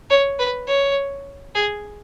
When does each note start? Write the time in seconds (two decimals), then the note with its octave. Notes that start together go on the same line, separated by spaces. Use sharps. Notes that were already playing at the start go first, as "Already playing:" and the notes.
0.10 C#5
0.39 B4
0.67 C#5
1.55 G#4